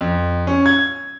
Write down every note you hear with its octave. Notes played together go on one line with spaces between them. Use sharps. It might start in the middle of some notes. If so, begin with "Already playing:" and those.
F2
C#4
G#6